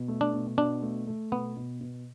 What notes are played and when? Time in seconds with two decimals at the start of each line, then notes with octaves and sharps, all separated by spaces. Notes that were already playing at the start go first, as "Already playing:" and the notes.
Already playing: B2
0.08 A3
0.21 D4
0.33 B2
0.57 B2 D4
0.82 A3
1.07 A3
1.31 B2 B3
1.57 B2
1.81 B2